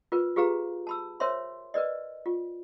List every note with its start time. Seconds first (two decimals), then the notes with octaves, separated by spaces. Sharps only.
0.12 F4 A#4 B4
0.36 F4 G4 G#4 B4 F5 A#5
0.87 A5 B5 E6
1.20 A#4 C5 C#5 E5 C6
1.74 A#4 B4 D5 D#5
2.26 F4